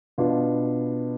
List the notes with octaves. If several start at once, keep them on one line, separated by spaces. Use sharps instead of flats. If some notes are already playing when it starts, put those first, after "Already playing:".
B2 B3 D4 F4